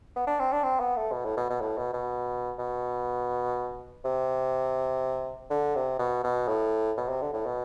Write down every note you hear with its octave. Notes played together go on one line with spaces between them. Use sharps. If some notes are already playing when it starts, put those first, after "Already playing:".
B3
D4
C4
D4
C4
B3
A3
B2
A2
B2
B2
A2
B2
B2
B2
C3
D3
C3
B2
B2
A2
B2
C3
D3
A2
B2